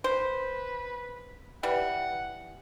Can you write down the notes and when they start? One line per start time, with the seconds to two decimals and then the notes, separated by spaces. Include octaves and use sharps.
0.04 B4 C5
1.63 E3 G3 F#5